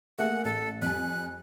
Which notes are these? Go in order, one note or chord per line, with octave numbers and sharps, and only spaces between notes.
A3 A#3 G#4 F#5
A1 A4
F2 G3 G#5 F#6